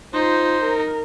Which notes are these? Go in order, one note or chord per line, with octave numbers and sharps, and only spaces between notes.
D#4 F4 C5
A#4